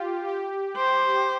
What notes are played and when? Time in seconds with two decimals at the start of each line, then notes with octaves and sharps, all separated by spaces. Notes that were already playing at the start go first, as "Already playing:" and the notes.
Already playing: F4 G4
0.27 G4
0.77 G4 C5